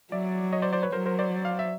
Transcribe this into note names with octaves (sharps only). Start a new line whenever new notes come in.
F#3 D5 E5
C#5 D#5
C5 D5
C5 D5
B4 C#5
F#3 A#4 C5
A#4 C5
C5 D5
F5
E5